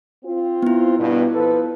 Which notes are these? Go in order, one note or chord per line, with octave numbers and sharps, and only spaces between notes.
C4 F4
B3 E4
G2 B2
F3 A4 B4